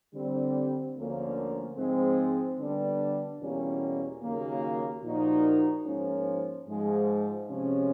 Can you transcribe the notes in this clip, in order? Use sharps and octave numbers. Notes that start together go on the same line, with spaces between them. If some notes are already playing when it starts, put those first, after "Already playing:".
D3 G3 C4
D2 D3 F3 A#3 C#4
G#2 F3 G#3 C4
D3 G3 B3 D4
E2 B2 G3 A#3 C#4
D#2 C#3 F#3 A#3
A#2 F3 A#3 D#4 F#4
G#2 F3 A#3 C#4
G#2 F3 G#3
C3 F3 G#3 C#4